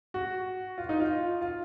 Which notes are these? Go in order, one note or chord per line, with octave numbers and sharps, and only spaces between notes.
F#4
F4
D#4
F4
F4